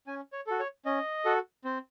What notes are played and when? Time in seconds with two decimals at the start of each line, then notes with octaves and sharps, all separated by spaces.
0.07 C#4 G#5
0.33 C#5
0.47 F#4 A4
0.60 C#5
0.85 C#4 D#5
1.25 F#4 A4
1.64 C4